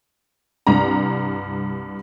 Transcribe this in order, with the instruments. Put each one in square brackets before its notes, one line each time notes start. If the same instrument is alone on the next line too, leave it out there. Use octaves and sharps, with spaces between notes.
[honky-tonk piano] C2 G2 A#5